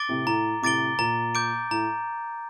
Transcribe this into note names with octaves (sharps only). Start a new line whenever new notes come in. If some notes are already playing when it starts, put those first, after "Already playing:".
Already playing: D6 A6 D7 G7
A2 C3
A2 A#5
A2 C3 D6 A6 D7 G7
A#2 A#5
D6 G6 D7
A2 A#5